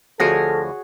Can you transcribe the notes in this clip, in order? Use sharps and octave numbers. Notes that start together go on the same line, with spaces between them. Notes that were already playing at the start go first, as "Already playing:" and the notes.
D2 F3 F#4 G#4 A4 C#5 A#6